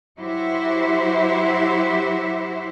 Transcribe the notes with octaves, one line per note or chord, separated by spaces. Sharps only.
F#3 E4 F#4 G4 C5 E5